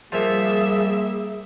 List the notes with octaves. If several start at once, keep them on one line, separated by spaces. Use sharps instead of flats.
A#2 F3 G3 A#3 G#4 E5